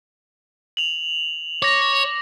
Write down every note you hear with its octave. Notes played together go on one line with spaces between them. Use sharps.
F7 F#7
C#5 D6 A#6